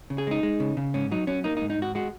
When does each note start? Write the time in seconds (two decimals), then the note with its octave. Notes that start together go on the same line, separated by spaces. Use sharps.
0.10 C#3
0.18 G#4
0.27 G#3 D#4
0.43 G#3
0.60 C#3
0.77 C#3
0.94 G#2 C#4
1.11 F#3 D#4
1.27 F#3 C#4
1.44 A#3 D#4
1.57 D#4
1.61 G#2
1.70 D#4
1.78 G#2 F#4
1.95 G#3 F#4